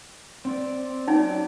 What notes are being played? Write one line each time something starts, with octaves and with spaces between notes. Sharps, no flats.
C4 D5
F#3 C#4 D#4 D5